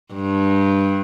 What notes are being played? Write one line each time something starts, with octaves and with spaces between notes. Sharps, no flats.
G2